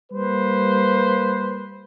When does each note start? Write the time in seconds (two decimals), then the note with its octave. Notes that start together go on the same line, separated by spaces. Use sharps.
0.12 G3 A#3 B4 C5